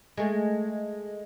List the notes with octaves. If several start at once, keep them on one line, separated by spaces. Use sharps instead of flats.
G#3 A3